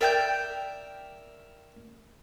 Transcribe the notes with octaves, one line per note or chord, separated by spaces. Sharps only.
A#4 D5 E5 G5 G6